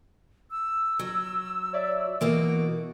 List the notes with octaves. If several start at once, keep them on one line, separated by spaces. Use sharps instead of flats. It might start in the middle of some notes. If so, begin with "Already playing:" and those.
E6
F#3
C#5 D5 E5
B2 E3 A#3 F#4 D7